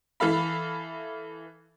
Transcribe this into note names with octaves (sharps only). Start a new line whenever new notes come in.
E3 A4 F5 B5